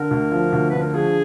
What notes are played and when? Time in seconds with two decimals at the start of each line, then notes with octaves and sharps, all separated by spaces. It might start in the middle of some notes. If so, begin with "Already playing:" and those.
Already playing: D3 A#4
0.11 D2
0.32 F3
0.53 D2
0.70 D3 B4
0.81 A#4
0.93 F3 G#4